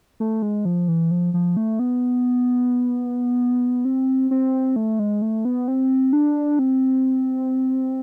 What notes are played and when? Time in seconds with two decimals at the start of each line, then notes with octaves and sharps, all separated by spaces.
0.20 A3
0.42 G#3
0.65 F3
0.88 E3
1.11 F3
1.34 F3
1.57 A3
1.79 B3
3.85 C4
4.31 C4
4.76 A3
4.99 G#3
5.22 A3
5.45 B3
5.68 C4
6.13 D4
6.59 C4